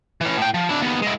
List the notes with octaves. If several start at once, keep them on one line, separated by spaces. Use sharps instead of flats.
E3 C#4
A2 G5
F3
D4 E4
D#2 B3
G#3 E4